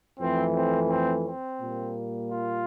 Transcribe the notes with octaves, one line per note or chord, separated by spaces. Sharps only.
F2 E3 A3 C4
C4
C4
C4
A#2 G3 A#3
F4